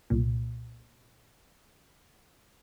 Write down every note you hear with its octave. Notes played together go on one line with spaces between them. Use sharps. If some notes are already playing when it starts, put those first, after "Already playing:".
C2 A#2